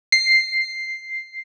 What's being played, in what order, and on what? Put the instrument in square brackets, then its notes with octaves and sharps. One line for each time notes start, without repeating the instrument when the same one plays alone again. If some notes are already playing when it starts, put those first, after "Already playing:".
[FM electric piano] C7